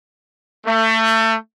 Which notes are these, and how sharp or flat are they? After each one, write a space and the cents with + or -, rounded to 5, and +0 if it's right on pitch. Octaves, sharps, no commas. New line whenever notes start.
A3 +25